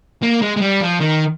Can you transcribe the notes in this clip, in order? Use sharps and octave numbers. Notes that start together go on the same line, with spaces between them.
A#3
G#3
G#3
G3
F3
D#3